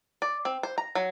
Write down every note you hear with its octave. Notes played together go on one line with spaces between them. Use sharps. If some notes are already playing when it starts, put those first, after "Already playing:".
D5
C4
C5
A#5
F#3